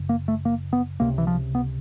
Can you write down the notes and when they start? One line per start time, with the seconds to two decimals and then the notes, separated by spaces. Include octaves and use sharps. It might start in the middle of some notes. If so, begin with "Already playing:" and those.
Already playing: F#1 F#2 C#3
0.09 A#3
0.28 A3
0.45 A#3
0.73 B3
1.00 C#2 C3 A#3
1.18 E3
1.27 F3
1.55 B3